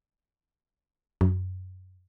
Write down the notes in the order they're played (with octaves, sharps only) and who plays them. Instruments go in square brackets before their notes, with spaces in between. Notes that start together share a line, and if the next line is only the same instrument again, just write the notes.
[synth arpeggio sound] F#2